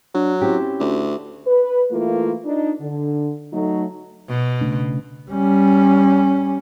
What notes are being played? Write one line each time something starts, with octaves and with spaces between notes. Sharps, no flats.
F#3 D4
C4 C#4 E4 G4
D2
B4
E3 A3 A#3 E4 F4
D4 D#4
D3
F#3 A3 D#4
B2
C#3 A3 D4
G3 C#4